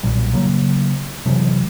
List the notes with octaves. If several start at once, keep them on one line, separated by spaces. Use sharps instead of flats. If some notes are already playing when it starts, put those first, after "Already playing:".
B1 A#2 G3
C#3 F#3 A#3
C3 E3 F#3 G#3